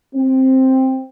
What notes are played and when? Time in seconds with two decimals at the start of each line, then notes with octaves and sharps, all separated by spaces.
0.15 C4